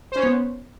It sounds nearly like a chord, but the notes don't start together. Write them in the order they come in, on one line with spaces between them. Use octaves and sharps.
C5 C#4 C#5 B3